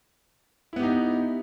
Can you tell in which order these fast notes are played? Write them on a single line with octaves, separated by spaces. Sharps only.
E4 B3 G4 D#4